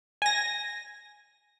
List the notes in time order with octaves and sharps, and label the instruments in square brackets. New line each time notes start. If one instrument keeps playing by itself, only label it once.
[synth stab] G#5 A#6